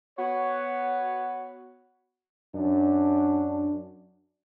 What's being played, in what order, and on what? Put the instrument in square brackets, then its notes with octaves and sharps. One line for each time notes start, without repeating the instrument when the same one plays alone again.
[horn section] B3 F#4 C#5
[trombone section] F#2 D4